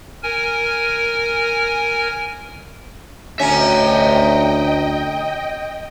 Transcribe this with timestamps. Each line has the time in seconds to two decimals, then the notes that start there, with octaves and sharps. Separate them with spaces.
0.23 A#4 G#5
3.40 D2 C#4 D#5 E5 G5 A#5